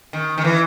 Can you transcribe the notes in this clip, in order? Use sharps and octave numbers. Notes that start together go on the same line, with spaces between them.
D#3
D#3
E3